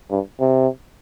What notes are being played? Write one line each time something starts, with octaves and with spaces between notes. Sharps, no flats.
G2
C3